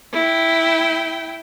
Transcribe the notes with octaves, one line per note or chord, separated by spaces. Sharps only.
E4 G5